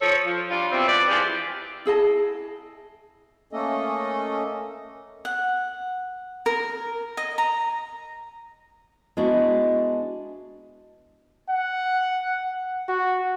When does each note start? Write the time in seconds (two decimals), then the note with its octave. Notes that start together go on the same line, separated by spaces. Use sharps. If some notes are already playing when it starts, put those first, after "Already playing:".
0.01 F3 A4 C#5
0.25 F3
0.50 G3 D4 F4
0.71 B2 E3 G3 C4
0.87 F3 B4 D5
1.09 E3 F3 F4 G4 G#4
1.86 E4 G#4 D#5 A5
3.53 A3 A#3 C#4 A4 D#5
5.25 F#5
6.46 A#4
7.17 D#5
7.38 A#5
9.17 G#3 B3 D4 E4 F#4
11.49 F#5
12.88 F#4